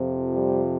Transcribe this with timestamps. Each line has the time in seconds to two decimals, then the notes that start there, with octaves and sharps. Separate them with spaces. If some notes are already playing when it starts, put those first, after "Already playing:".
Already playing: F2 C3 F3
0.34 G3